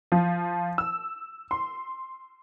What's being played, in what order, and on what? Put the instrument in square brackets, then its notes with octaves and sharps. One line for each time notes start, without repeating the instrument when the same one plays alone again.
[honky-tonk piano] F3
E6
C6